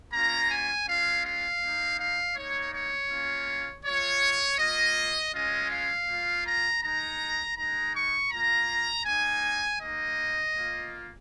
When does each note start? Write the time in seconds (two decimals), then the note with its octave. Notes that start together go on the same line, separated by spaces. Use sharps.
0.12 A#3 C#4 F4 A#5
0.50 G#5
0.87 G#3 C#4 F4 F5
1.24 F5
1.61 A#3 D#4
1.99 F5
2.36 A#3 D#4 C#5
2.72 C#5
3.10 A#3 C#4 F4
3.84 G#3 F4 C#5
4.59 A#3 F4 D#5
5.34 G#3 C#4 F4 D#5
5.70 F5
6.08 A#3 F4
6.45 A#5
6.82 G#3 D#4 A#5
7.56 G#3 D#4 A#5
7.93 C#6
8.31 A#3 F4 A#5
9.05 A#3 D#4 G#5
9.80 A#3 D#4 D#5
10.54 A#3 F4